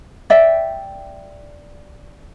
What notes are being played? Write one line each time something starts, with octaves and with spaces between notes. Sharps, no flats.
D5 E5 G5